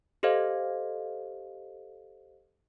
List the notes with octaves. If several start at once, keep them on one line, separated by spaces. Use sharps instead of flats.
G4 A4 C5 D#5 F5